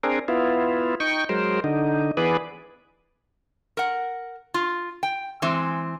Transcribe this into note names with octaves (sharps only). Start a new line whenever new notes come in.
C4 D4 G#4 A#4
B3 E4 F4
D#4 G5 C#6
F#3 G#3 A#4 C5
D3 D#4
E3 B3 G#4 B4 D5
A#4 F#5
F4
G5
E3 G#3 C4